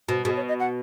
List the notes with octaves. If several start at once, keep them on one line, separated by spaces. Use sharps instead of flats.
B2
B2 G#4
C#5
D#5
F#5